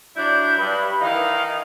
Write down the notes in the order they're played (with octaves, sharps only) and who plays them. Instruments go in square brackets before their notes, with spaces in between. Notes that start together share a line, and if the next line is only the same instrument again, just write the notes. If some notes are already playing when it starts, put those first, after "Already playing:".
[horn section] F#3 D4 E4 [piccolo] G6
[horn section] G2 [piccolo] B5
[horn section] D#3 E3 D#4 [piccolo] F5